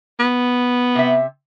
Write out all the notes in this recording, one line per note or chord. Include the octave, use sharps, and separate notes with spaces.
B3
C3 E5